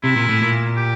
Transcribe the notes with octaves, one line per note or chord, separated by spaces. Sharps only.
C3 E4
A#2
A2
A#2
G4